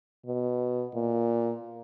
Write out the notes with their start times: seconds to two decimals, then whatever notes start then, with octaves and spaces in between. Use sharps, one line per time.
0.26 B2
0.94 A#2